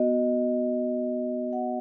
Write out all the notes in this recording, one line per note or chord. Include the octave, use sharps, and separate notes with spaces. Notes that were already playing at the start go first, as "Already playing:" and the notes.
Already playing: B3 F#4 D#5
F#5